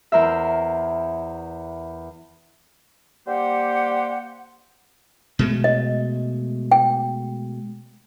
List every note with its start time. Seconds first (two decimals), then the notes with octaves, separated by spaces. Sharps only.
0.12 E2 A#4 C5 E5
3.26 G3 A#3 G4 C5 F#5
5.39 B2 G#3 A3
5.64 D#5
6.72 G5